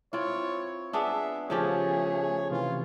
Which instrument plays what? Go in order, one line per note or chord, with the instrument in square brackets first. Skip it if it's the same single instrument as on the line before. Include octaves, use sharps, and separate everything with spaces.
[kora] C4 F4 [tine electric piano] E4 [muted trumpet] C#5
[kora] B3 D4 G#4 [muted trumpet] E5
[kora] C#3 F3 G4 [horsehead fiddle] A3 G#4 [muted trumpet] C#5
[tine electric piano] C3 E3 [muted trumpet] F4